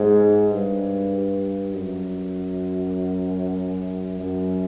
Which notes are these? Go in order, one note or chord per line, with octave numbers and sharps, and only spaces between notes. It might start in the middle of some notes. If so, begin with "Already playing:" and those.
Already playing: G#2
G2
F#2
F#2